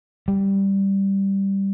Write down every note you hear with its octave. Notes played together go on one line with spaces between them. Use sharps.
G3